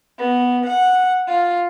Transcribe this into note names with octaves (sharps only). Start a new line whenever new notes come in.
B3
F#5
F4